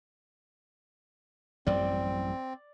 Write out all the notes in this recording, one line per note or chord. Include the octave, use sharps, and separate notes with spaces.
A1 F#2 G3 C4 D5